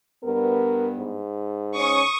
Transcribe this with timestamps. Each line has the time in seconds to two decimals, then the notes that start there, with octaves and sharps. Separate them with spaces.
0.24 G2 B3 A#4
0.98 G#2
1.76 C#4 C#6 D#6